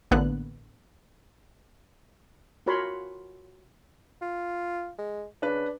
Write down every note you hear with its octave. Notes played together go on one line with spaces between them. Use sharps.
A1 D3 A#3 B3 F#6
F4 F#4 A#4 C#5 B5 C6
F4
G#3
C#3 D4 B4